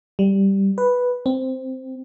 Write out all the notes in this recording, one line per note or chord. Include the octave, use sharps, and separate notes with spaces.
G3
B4
C4